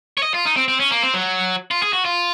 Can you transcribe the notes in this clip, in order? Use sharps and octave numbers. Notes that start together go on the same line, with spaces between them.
C#5
D#5
F4
D#4
C4
C4
C#4
A#3
C4
F#3
F4
G#4
F#4
F4